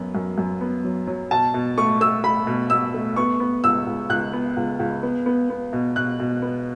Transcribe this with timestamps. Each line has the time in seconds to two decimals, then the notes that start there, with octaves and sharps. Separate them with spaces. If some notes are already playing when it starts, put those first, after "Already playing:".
Already playing: F#2 F#3 B3
0.15 F#2
0.38 F#2
0.61 B3
0.84 F#3
1.07 F#3
1.31 B2 A5
1.54 B2
1.78 A3 C#6
2.01 A3 E6
2.24 A3 B5
2.47 B2
2.70 B2 E6
2.94 A3
3.16 B3 C#6
3.40 B3
3.64 C#2 E6
3.86 C#2
4.09 C#2 F#6
4.33 B3
4.57 C#2
4.79 C#2
5.03 B3
5.26 B3
5.50 B3
5.73 B2
5.96 B2 F#6
6.20 B2
6.42 B3